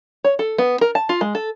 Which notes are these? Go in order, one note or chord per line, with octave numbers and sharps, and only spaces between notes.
C#5
A4
B3
A#4
A5
F4
G#3
A4